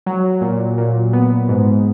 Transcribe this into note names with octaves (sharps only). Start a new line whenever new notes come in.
F#3
A#2
A#2
B3
G#2